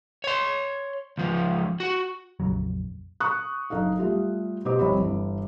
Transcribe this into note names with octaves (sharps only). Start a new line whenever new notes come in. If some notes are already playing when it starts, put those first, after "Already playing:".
C#5 C6
C#2 F3
F#4
A#1 F2 C#3 F#3
C#6 D#6 F#6
F#1 D#4 A4 F5
G3 A3 F4 G4
B2 G4 C5 D#5 D6
F1 C2 C#5 D#5 B5
G1 E3 E4